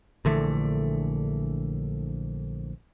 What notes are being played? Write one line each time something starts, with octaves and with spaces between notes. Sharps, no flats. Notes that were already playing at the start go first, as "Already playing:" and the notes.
A#1 D3 E3 A3